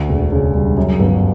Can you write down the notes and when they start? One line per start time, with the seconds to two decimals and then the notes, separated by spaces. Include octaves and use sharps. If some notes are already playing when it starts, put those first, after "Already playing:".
Already playing: D2
0.09 E1
0.32 C#3
0.54 G3
0.77 F#2
1.00 G1